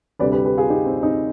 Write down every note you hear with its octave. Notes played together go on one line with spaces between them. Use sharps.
D2 C3 G3 B4 D5
G4 B4
G4 B4
F4 G#4
D#4 G4
C4
C4 D#4